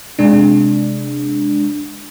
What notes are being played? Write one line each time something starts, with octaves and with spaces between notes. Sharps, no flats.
C3 G#3 D4